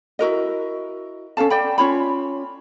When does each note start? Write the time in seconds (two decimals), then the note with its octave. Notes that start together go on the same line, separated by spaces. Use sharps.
0.19 E4 F#4 A#4 D#5
1.37 C#4 A4 F5 A5
1.50 D5 G5 B5
1.78 C#4 F4 C#5 B5